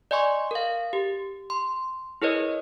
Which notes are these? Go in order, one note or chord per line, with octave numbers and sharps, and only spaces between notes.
D5 D#5 G#5 C6 C#6
A#4 F5
G4
C6
E4 G#4 A#4 B4 C#5 D#5